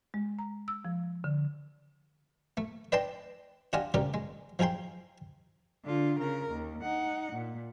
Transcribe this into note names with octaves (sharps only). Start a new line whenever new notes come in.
G#3
A#5
E6
F3
D3
A3
B4 D5 D#5 G5 A5 C6
D4 F4 G4 D#5 F#5 G#5
C#2 G#2 G4 A#4 D5
G#3
F3 D#4 G#4 G5 C6
D3 F4
C#3 A#4
D#2
D#4 F#5
A#2